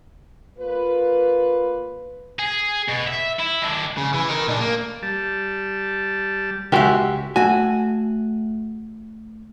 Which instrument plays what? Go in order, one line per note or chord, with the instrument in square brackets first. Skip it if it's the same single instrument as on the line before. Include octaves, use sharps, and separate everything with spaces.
[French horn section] A#3 F4 B4
[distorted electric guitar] G#4
B2
E5
E4
D#3 D4
[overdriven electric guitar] C#3
E3
D#4 A#4
A#2 D4
A#3
[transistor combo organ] G3 A5
[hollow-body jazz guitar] C#2 E5 [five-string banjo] G#3 F#4 G4
[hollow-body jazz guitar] A3 G#5 [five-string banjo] F#4